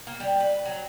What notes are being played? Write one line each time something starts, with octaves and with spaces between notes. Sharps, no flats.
A#3
G3
B4
F#3